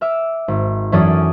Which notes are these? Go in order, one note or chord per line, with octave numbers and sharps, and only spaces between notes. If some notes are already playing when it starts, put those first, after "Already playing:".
E5 D6 F6
G#1
F#2 E3 C#4 A4 D5 D#6